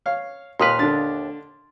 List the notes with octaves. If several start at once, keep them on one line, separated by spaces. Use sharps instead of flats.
C#5 F5
D#2 A#2 B4 C6 D#6 F6
D3 D4 A6